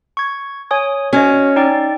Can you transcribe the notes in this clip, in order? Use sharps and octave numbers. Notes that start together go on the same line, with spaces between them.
C#6 G#6
C#5 G#5 D#6
C#4 F#4 C#5 D#5
D#4 D5 G5